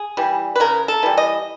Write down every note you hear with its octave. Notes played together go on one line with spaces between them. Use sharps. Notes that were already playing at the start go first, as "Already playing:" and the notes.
Already playing: G#4
E3 G3
B4
C#3 A#4
A4
E3 G3
D#5